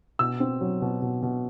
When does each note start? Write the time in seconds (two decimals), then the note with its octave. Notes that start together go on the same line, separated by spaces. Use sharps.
0.19 B2 E6
0.40 C4
0.61 F#3
0.82 B2
1.02 B2
1.23 B2